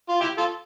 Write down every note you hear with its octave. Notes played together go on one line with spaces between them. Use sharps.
F4
E4 G4
F4 A4